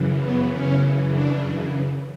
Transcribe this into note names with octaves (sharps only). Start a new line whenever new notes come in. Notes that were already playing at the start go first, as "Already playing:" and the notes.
Already playing: F#2 C#3 E3
B3
C#4
D4